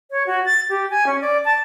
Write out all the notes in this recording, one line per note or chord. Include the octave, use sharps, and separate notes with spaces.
C#5
F#4
A6
G4
G#5
C#4
D5
A5